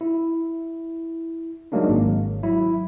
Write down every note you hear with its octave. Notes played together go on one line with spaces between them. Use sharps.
E4
F#3 G#3 A#3 D4 D#4
G#1
F#3 E4